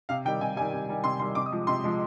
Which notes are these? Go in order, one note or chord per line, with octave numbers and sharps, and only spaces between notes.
C3 F5
D#3 G3 G5
C3 G#5
D#3 G3 G#5
C3
D#3 G3
C3 C6
D#3 G3 C6
C3 D6
D#6
F3 G#3
C3 C6
F3 G#3